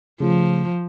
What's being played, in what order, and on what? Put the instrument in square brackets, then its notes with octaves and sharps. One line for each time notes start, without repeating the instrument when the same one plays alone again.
[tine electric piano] C#3 A3 F4 [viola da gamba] F3